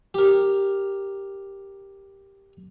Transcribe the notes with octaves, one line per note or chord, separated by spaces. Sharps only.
G4 A#4